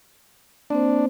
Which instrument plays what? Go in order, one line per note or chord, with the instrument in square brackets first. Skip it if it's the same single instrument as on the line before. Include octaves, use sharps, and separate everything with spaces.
[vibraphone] A#3 C4 C5 [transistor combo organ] D4